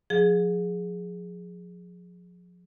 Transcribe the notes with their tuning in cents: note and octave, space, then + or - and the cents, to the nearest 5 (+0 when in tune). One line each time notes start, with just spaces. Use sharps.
F3 +35 G#4 +0